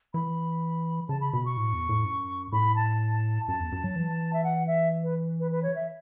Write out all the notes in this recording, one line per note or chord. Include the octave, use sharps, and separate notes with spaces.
E3 B5
C#3 A5
B5
B2 B5
C#6
A2
E2
A2
F#2
A2 B5
A5
F#2 A5
E2
F#2
F#3
E3
E5
F#5
E5
B4
B4
B4
C#5
E5